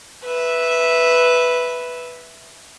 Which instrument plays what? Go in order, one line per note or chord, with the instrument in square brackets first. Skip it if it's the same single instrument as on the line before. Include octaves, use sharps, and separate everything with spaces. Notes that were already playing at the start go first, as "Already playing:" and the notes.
[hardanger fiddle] B4 E5